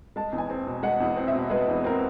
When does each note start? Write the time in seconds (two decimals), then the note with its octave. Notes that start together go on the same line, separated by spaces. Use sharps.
0.16 G#3 A5
0.33 E2
0.38 G#5
0.50 C4
0.67 B2
0.83 G#3 F#5
1.00 E2
1.16 C4
1.28 E5
1.34 B2
1.50 G#3 B4
1.68 E2
1.84 C4 A#4